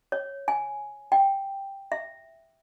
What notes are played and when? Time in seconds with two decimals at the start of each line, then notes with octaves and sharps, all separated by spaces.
0.12 C#5
0.48 G#5
1.12 G5
1.92 E5